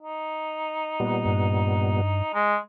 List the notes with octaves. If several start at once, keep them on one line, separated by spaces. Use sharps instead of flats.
D#4
A#2 G3 B3
G2
G#3